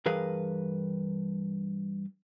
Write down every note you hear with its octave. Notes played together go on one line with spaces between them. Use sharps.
G2 E3 G#4 A#4 B4 F5